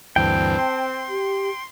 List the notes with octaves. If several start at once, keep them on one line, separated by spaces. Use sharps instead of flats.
D2 G2 E3 C4 G5 A5
C6
G4